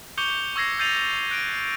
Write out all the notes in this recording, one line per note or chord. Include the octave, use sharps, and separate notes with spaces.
C#6 D6 G6 C#7 F7 G7
C#6 E6 G#6 A#6 C7
E6 G6 A6 C7 D#7 F7
F#6 D7